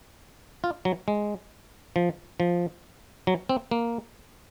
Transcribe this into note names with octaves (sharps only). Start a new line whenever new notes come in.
F4
F#3
G#3
F3
F3
F#3
C4
A#3